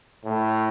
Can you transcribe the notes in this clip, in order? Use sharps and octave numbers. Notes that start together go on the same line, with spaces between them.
A2